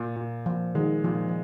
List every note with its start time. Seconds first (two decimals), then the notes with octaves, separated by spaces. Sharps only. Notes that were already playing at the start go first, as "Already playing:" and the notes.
Already playing: A#2
0.16 A#2
0.46 A#2 F3
0.75 D#3 G#3
1.04 A#2 F3
1.28 F3